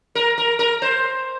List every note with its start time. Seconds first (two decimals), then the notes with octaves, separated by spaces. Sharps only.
0.15 A#4
0.38 A#4
0.59 A#4
0.82 C5